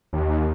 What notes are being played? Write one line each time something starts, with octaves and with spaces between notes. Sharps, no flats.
D#2